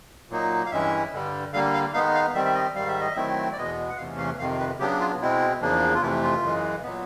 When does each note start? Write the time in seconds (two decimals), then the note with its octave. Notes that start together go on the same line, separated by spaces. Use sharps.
0.30 A#2 F#3 A#3 D#4
0.66 F5
0.71 G2 E3 G#3 C#4 E4 E5
1.12 G2 D3 G3
1.53 D3 G3 A#3 F5
1.73 F5
1.93 D#3 G#3 B3 D#4 F5
2.14 F5
2.34 D#3 G3 C4 E5
2.45 E5
2.55 D#5
2.75 G#2 D#3 G3 F5
2.88 E5
3.01 D#5
3.13 D#3 F#3 A3 C4 E4 E5
3.52 D5
3.58 E2 B2 G#3 B3 D#5
3.90 F#5
3.97 E2 C3 E3 A3 C#4 F5
4.18 F5
4.39 F2 C3 D#3 F5
4.59 B4
4.79 C#3 F#3 B3 D4 G4
5.00 F4
5.21 B2 G#3 C4 E4
5.61 E2 C#3 F3 A#3 D4
5.95 F4
6.02 F2 C3 E3 A3 E4
6.23 F4
6.43 F#2 C#3 E3 G#3
6.83 A#2 F#3 B3